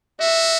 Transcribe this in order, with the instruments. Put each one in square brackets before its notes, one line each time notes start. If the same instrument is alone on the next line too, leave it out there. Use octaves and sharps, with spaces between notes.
[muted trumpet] F#4 [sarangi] E5